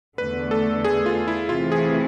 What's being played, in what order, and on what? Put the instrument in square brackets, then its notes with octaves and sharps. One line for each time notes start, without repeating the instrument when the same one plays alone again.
[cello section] E2 D3 A3 [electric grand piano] B4
[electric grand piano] A4
G#4
F4
E4
[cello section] C3 E3 A3 E4 [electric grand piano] F4
[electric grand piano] G#4